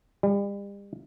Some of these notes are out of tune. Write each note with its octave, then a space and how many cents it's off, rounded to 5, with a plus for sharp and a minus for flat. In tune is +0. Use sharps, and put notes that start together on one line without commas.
G3 +40